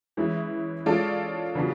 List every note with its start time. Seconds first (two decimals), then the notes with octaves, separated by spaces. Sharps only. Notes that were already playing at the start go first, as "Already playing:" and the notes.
0.17 E3 G#3 C#4 E4
0.86 G#3 C#4 F4 A4 D5
1.55 C#3 F#3 B3 D4 F4